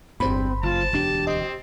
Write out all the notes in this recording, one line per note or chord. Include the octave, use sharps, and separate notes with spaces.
G1 E2 G2 C4 C5 B5
F#1 F4 A5
E1 D2 D4 G4
C4 D#5